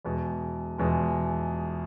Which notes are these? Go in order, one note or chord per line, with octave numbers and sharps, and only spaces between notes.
E2 B2 G#3
E2 B2 G#3